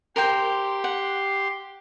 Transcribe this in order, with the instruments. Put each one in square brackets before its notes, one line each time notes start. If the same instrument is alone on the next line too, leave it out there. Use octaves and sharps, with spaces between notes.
[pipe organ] G4 C6 [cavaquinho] A#4 C5 G5
[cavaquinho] F#5